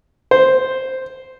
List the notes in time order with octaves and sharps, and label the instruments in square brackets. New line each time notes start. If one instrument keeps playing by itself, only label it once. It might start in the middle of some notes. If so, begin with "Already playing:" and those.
[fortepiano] C5